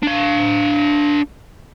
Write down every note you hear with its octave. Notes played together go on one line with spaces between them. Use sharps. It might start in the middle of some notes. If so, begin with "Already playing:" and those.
D4 F5